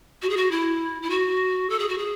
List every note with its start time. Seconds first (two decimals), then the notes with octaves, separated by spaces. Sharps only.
0.22 F#4
0.29 G#4
0.36 F#4
0.51 E4
1.02 E4
1.10 F#4
1.69 A4
1.79 G#4
1.88 F#4
1.98 G#4